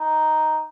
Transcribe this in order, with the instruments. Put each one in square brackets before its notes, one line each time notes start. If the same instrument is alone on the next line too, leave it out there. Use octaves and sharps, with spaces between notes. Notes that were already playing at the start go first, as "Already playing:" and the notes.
Already playing: [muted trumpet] D#4